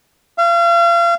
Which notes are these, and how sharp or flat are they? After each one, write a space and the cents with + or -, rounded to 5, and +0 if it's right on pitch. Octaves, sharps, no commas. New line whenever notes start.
F5 -35